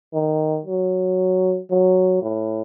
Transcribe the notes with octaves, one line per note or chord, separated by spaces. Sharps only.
D#3
F#3
F#3
A2